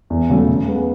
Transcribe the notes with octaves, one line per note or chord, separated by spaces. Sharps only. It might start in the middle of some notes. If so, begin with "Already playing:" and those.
E2
C#3 F#3 A3 C#4
C#3
G#3 B3